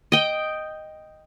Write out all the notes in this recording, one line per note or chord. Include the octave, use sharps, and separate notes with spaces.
D#5 G5